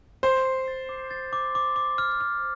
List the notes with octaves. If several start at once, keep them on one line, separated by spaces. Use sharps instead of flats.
C5 C7
C7
A6
D6
A6
D6
D6
D6
F6
F6